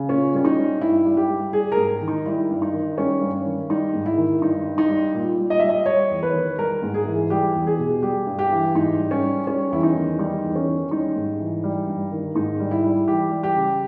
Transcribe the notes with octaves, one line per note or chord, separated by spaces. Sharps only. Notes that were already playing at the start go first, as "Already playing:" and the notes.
Already playing: C#3
A#2 C#4
G3 C#4
D#4
G3
G2 E4
G3
G4
G3
G3 G#4
A#4
G#2
D#3
D#4
G3 E4
G2
D#4
D#3
G3 C#4
G2
D#3
G3 D#4
G#2
E4
D#3
G2 D#4
G3
D#4
G3
A#2
G3
D#5
G3 E5
D#5
G3 C#5
E2
B4
D#3
G3 A#4
G#2
G#4
E3
G3 G4
E2
G#4
B2
G3 G4
G2
G4
E3
G#2 D#4
G3
C#4
G3
G3 C#4
E2 E4
D#4
D#3
G3 D#4
E2
C#4
D#3
G3 D#4
G#2
E3
G3
G2
D#3
G#2 D#4
G3
E4
G3
E3 G4
G3
G4
C#3